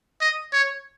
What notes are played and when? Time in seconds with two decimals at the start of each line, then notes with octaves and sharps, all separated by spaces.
0.21 D#5
0.53 C#5